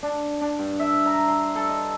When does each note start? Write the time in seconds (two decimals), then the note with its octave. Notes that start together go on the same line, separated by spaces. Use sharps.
0.03 D4
0.41 D4
0.59 G2
0.80 E5
1.06 A#5
1.28 C6
1.55 A4
1.69 D#5